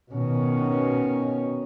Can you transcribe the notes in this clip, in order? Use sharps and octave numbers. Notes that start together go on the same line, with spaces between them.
B2 D#3 C#4